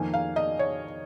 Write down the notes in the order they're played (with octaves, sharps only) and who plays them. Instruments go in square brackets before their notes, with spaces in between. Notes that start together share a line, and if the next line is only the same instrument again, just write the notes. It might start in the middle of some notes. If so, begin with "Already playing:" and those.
Already playing: [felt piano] F2 D#3 A#3 G#5
F5
D#5
C#5